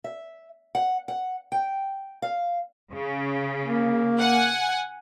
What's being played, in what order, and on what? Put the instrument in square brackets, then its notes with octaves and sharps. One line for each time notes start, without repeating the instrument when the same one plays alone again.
[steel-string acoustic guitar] E5
F#5
F#5
G5
F5
[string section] C#3
[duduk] A#3
[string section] F#5 G#5